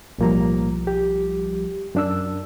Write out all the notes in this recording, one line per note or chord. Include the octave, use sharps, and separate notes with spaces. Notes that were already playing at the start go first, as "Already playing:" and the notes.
B1 A2 F3 G3 A#3 A#5
G4
F#2 D4 E6